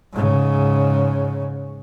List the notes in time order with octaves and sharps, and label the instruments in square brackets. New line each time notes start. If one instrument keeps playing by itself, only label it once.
[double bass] G#2 C#3